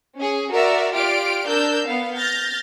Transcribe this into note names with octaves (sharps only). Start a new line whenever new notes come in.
C#4 G#4
F#4 A#4 D5 E5
F4 G4 D5 F6 D7
D4 A#4 E6 G6
B3 F5
F6 G6 A6 A#6